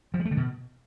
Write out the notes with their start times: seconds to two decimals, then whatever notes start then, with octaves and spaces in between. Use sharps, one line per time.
0.14 F3
0.20 G#3
0.25 A3
0.31 D3
0.37 B2